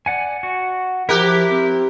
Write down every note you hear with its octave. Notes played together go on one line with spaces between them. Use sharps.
D5 F#5 G#5
F#4
F3 E4 G4 A#4 F#6
C4